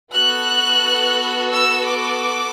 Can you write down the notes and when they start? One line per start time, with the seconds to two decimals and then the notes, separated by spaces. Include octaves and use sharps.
0.12 B3 F#4 A4 F#6
1.53 E6
1.87 D6